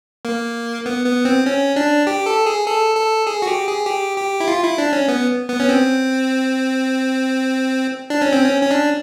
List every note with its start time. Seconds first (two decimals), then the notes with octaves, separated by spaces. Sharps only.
0.25 A#3
0.86 B3
1.06 B3
1.25 C4
1.46 C#4
1.76 D4
2.07 G4
2.26 A4
2.46 G#4
2.67 A4
2.96 A4
3.27 G#4
3.42 F#4
3.47 G4
3.68 G#4
3.87 G4
4.18 G4
4.40 E4
4.48 F4
4.64 E4
4.78 D4
4.93 C#4
5.08 B3
5.48 B3
5.60 C#4
5.69 C4
8.10 D4
8.22 C#4
8.33 C4
8.44 C#4
8.62 C#4
8.71 D4